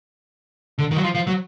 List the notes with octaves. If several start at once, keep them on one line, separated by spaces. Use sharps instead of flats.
D3
D#3
F#3
F3
F3
F#3